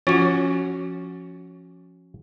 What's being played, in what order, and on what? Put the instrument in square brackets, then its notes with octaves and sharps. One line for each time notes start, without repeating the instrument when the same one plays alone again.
[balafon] F3 F4 [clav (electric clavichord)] C#4 F#4